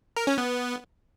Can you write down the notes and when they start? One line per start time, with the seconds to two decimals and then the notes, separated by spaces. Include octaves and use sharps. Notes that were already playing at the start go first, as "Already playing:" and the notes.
0.17 A#4
0.27 C#4
0.38 B3